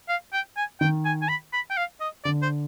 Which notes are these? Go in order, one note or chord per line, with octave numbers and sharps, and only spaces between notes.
F5
G5
G#5
D#3 G5
G#5
G#5
B5
B5
G5
F5
D#5
D3 D5
C5